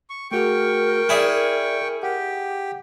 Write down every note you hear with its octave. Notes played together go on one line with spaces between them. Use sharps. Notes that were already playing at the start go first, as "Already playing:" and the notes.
C#6
A3 F#4 G#4 A#4 G5 C#6
E4 G#4 D5 E5 G#5
G4 F#5